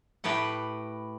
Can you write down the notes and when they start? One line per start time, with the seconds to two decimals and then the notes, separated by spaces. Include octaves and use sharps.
0.24 A2 G4 B4 F#5